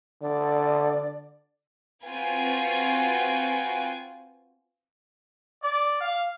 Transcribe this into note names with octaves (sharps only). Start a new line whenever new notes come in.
D3 D5
C4 F4 F#4 B4 G5 G#5
D5
F5